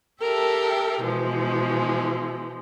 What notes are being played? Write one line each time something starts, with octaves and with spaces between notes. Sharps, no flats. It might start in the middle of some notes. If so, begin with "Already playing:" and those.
G4 A4 A#4 E5
B2 E3 F3 G#3